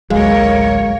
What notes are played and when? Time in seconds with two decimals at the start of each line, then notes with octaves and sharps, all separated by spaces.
0.10 A1 D2 F#3 G#3 A#3 A#4 C#5 F5